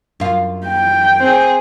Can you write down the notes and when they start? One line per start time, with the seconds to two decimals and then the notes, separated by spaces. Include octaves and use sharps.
0.20 F#2 F4
0.67 G5
1.19 C4 G#4